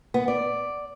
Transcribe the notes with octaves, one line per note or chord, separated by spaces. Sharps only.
B3
D5